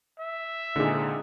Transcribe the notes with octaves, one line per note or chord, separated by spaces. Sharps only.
E5
A#2 D3 C4 D#4 G#4